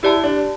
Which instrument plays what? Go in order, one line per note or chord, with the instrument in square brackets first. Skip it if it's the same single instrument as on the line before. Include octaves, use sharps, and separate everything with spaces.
[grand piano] E4 [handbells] G4 D5 A5
[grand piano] D4